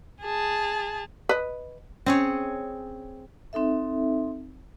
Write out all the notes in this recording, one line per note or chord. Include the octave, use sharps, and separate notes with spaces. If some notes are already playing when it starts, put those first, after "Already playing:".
G#4 A5
B4 D#5
C4 C#4 G#4 C#5
C4 D#4 A4 E5